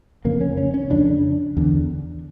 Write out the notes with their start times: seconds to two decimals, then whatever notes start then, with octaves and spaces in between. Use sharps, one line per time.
0.25 F2 C#3 A#3
0.41 C#4
0.57 C#4
0.74 C#4
0.90 F2 C#3 D4
1.57 E2 D3